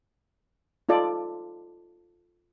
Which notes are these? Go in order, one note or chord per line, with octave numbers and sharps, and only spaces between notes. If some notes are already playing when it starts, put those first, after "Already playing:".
D#4 F4 A4 D5